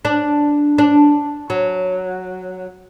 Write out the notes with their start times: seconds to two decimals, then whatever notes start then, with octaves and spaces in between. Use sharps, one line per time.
0.05 D4
0.78 D4
1.50 F#3